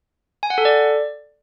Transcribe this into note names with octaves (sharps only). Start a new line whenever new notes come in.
G#5
F#5
A4
D5